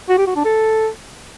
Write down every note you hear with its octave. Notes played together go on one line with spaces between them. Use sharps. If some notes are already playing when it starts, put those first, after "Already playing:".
F#4
G4
F#4
D4
A4